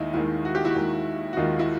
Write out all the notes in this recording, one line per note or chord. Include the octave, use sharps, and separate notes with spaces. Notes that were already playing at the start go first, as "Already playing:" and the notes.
Already playing: D#2 D#3 G#3 D#4 E4
D#2 D#3 G#3 E4
F#4
G4
E4 F#4
D#2 D#3 G#3
F#4
D#2 D#3 G#3 D#4 F4
E4